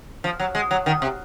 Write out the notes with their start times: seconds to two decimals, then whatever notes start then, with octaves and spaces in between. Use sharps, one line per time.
0.24 F3
0.40 F#3
0.55 G#3
0.71 F#3
0.86 D#3
1.02 C3